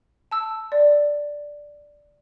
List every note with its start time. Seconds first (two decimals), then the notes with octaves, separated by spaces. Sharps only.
0.31 A5 E6
0.72 D5